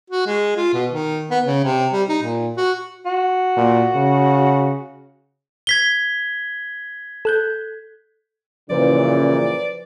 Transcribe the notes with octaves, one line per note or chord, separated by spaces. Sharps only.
F#4
G#3
F4
B2
D#3
B3
C#3
C3
G3
D#4
A#2
F#4
F#4
A#2
C#3
G#6 B6 G7
A4 F#6 G6
F#2 A#2 C#3 E3 F3 B4 C5 D5